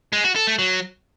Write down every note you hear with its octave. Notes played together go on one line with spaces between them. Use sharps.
G#3
F#4
A4
A3
F#3